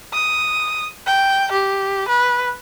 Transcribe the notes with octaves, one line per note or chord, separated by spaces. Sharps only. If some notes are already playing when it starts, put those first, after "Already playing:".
D#6
G5
G4
B4